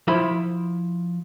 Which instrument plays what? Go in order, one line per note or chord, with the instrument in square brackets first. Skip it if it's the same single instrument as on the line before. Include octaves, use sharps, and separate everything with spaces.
[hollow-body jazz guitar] F3 E4 E5 B5